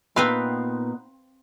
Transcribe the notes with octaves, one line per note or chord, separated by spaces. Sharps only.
A#2 B3 C4 D#4 B4 F5